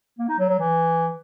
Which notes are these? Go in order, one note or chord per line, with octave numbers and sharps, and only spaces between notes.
A#3
D#4
F#3
F#3
E3